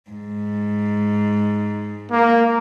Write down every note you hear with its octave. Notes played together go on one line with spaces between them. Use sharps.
G#2
A#3